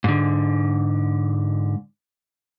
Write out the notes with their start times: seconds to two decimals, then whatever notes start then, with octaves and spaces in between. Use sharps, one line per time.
0.04 G#2 D3